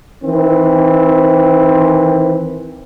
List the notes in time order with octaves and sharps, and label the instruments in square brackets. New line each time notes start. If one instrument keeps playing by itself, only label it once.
[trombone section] D#3 E3 C4